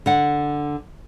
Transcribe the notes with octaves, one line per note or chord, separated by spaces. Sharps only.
D3 F#5